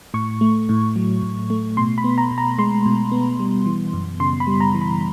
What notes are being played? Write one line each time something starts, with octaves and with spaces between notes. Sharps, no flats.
A2 C#6
A3
A2
F#3
A2
A3
B2 C6
B5
B3
A#5
B2
A#5
G#3 C6
B2
B3
G3
E3
F#2
C#3 C6
B5
G3
A#5
E3
B5